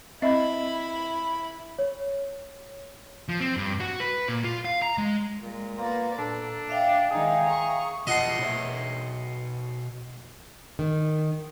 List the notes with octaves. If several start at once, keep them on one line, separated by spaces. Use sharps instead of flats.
C4 E4 D#5 E5 B5
C#5
F3
C4
G2
F#4
B4
A#2
F4
F5
A#5
G#3
A#2 G#3
A#3 B3 F4 D5 A#5
A#2 D4 A4
D5 E5 F5 G5
D#3 G#3 D#4 G#4 G#5
A#5 C#6
B2 F4 D#5 F#5 A5 C6
B2 C#5 E5
D#3